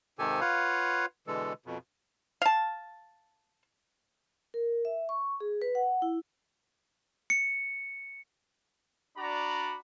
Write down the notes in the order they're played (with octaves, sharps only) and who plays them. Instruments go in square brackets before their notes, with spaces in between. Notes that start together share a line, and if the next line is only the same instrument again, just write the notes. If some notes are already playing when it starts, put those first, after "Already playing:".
[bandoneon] G#2 C3 D#3 G4 A4 G#5
F4 B4 C#5 F5 F#5
B2 D3 E3 G#3 A4
F2 B2
[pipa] F5 A5
[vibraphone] A#4
E5
C#6
G#4
B4
F#5
E4
[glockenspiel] C#7
[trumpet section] D4 F#4 D5 A#5 B5